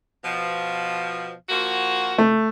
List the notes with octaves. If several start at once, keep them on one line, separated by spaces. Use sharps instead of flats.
B2 F3
F3 A#3 F#4
A3